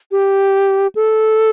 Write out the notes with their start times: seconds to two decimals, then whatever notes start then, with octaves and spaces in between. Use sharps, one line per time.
0.12 G4
0.95 A4